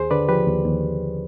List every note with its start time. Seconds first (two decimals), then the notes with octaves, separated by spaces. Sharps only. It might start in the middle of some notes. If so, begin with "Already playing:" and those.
Already playing: D#2 G#4 C5
0.11 D3 B4 D5
0.29 F3 G4 B4
0.47 D#2
0.65 D#2